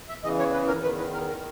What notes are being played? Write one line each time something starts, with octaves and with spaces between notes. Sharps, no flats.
E5
E2 C#3 E3 D#5
C#5
B4
A#4
E2 D#3 B4
B4
A#4
A#4